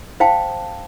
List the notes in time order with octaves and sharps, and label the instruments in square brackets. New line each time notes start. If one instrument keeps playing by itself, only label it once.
[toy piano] C5 F5 G5 A5